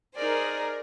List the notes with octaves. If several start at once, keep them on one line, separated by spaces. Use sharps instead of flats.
D#4 G#4 A#4 C5 D5